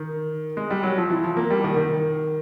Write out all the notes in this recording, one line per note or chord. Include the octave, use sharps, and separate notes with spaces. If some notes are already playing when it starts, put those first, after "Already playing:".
Already playing: D#3
G#3
G3
F#3
F3
E3
F3
A#3
G3
D#3
D#3